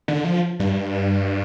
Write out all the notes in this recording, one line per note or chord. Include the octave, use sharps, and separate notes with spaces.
D3
F3
G2